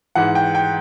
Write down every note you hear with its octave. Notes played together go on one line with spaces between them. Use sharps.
G#2 E3 F#5
G5
G5